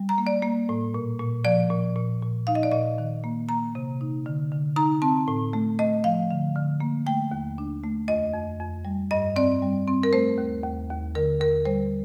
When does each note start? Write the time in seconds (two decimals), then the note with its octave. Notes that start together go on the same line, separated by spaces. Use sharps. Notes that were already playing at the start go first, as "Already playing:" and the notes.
Already playing: G3
0.09 A#5
0.18 A#3
0.27 D5
0.42 A#3
0.69 A2
0.94 A#2
1.19 A#2
1.44 F3 D5
1.70 A#2
1.96 A#2
2.22 A#2
2.47 D#4 F5
2.55 D#5
2.63 D5
2.72 A#2 D#5
2.98 D#3
3.24 A#3
3.49 A#3 A#5
3.75 C3
4.01 D#4
4.26 D3
4.52 D3
4.76 D#4 A#5
5.02 C4 A5
5.28 A2
5.53 A3
5.79 A3 D#5
6.04 F3 F5
6.31 D3
6.55 D3
6.80 A#3
7.06 A3 G5
7.31 D#2
7.58 D4
7.84 A3
8.08 F2 D#5
8.34 F2
8.60 F2
8.85 G3
9.11 G2 D#5
9.36 C4 D5
9.62 G3
9.88 C4
10.03 A#4
10.13 A3 C5
10.38 D#2
10.63 D#2
10.90 D#2
11.15 D3 A#4
11.40 D#2 A#4
11.65 G3 C5